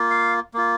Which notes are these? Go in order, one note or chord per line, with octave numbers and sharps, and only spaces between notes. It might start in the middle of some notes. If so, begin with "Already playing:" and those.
Already playing: A#3 F4
F5
A#3 F4